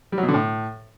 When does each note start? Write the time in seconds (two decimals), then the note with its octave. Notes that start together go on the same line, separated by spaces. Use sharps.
0.12 G3
0.18 F#3
0.23 B2
0.28 D3
0.34 A2